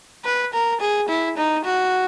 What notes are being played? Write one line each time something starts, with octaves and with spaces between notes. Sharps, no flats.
B4
A#4
G#4
E4
D#4
F#4